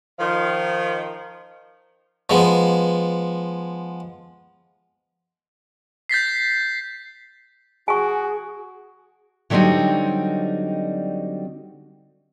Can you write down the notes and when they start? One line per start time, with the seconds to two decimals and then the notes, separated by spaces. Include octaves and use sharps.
0.19 D#3 F3
2.30 F3 G#3 B3
6.09 G6 A6 B6 C7
7.88 F#4 G#4 G#5 C#6
9.50 D3 F#3 G3 C4 D#4 F#4